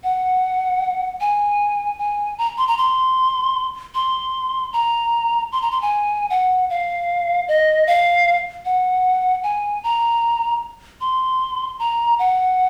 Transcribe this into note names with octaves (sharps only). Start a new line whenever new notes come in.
F#5
G#5
G#5
A#5
C6
A#5
C6
C6
A#5
C6
A#5
C6
G#5
F#5
F5
D#5
F5
F#5
G#5
A#5
C6
A#5
F#5